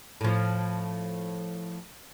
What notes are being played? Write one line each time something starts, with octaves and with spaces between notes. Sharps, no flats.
A2 F3